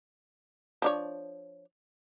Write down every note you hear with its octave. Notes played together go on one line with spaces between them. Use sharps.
F3 D4 C#5